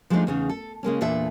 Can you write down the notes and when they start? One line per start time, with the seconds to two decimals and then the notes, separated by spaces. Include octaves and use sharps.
0.10 F3 G#3 A3 C4 D4 D#4
0.27 E2 C#3 D#4
0.49 A4
0.83 C#3 G#3 A#3 C#4
1.01 E2 A#2 D4 A4 E5